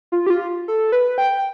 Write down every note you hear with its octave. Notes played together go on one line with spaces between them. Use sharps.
F4
G4
F4
A4
B4
G5